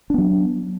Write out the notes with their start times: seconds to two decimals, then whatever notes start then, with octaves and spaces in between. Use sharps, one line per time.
0.10 D4
0.14 B3
0.18 F#3